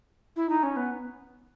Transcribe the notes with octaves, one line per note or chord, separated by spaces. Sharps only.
E4
D#4
C#4
B3